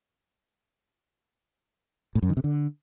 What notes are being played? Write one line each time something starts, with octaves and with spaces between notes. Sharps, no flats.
A2
F#2
D#3
C3
D3